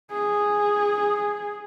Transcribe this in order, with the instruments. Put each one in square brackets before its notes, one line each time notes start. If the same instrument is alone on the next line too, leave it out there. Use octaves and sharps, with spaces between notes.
[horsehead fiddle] G#4